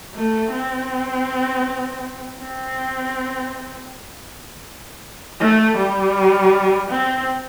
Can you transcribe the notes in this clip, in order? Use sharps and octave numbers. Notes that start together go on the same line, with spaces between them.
A3
C4
C4
A3
G3
C4